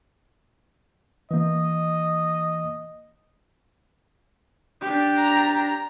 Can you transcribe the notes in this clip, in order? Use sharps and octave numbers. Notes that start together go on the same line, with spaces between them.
E3 A#3 D#5
D4 G4
A#5